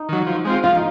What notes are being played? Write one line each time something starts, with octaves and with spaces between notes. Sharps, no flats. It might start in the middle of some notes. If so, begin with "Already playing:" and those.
Already playing: D#4
D#3 F#3
F3
G#3 C4 F4
F3 F4
D#4